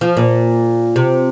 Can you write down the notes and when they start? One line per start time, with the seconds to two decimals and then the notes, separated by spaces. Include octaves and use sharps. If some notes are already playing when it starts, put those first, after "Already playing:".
0.01 F3
0.17 A#2
0.96 C3